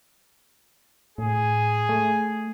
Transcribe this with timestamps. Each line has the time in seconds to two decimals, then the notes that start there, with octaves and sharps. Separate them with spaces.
1.18 A2 G#4
1.89 A3